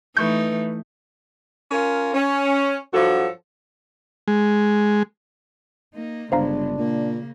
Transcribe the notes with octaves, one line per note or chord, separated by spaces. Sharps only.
E3 A3 D#4 B4 C#6 G6
C#4 F4 A#4
C#4
G2 F3 F#3 F#4 A4
G#3
A#3 D#4
G1 C#3 G#3 D4 C5 F5 A#5
A#2 C#3 A#3